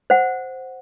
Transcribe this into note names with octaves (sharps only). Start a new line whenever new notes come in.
C5 F#5